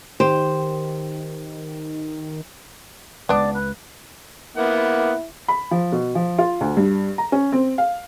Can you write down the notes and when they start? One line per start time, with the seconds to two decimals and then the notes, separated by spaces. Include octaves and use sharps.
0.20 D#3 G4 C5
3.29 C#2 B3 D4 D5
3.54 B4
4.57 A#3 B3 E4 F#5
5.48 B5
5.71 F3
5.92 B2
6.15 F3
6.38 F4
6.61 D2
6.77 G2
7.18 A#5
7.32 C#4
7.52 C4
7.78 F5